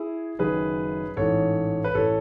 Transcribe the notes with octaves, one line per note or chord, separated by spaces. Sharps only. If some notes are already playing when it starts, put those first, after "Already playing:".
Already playing: E4 G#4
F#1 F#2 D#3 G#4 B4
A1 G#2 E3 A4 C#5
B4
A1 E3 A4 C#5